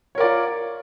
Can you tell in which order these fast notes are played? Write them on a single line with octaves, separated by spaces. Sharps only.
C#5 A#4 D5 F4